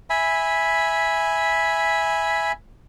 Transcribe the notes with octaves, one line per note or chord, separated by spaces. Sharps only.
E5 G#5 B5